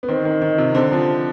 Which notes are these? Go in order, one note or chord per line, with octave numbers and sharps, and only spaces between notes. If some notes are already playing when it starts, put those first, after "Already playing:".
B3
D#3 C4
D#3
D#3
C3
D3 C4
F3